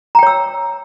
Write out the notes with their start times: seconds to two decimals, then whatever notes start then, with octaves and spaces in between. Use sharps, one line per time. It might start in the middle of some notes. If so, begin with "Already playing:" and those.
0.15 A#5
0.19 G5
0.23 C#5
0.27 E6